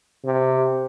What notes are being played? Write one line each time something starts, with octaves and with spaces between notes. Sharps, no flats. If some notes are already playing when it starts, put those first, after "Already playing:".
C3